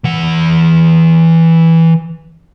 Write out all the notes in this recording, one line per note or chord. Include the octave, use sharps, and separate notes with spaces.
E3 F#5